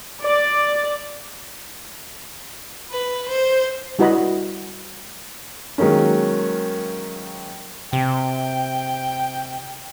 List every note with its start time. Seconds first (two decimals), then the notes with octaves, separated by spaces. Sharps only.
0.23 D5
2.91 B4
3.29 C5
3.99 G3 E4 F#4 B4 D#5 B5
5.78 D#3 F#3 G#3 A#3 C#4
7.93 C3 G5